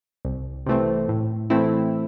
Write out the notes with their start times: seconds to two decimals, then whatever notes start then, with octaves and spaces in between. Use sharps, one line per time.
0.25 C2
0.66 C3 E3 A3 C4
1.08 A2
1.50 E3 A3 C4 E4